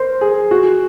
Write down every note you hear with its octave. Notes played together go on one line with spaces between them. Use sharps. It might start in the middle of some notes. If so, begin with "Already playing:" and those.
Already playing: A#4 C5
G#4
F#4